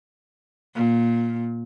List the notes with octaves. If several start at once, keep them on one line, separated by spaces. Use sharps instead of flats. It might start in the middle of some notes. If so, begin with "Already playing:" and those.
A#2